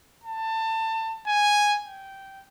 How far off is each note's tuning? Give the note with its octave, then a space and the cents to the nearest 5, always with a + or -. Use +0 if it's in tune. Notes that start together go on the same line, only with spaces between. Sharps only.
A5 +25
G#5 -5
G5 -15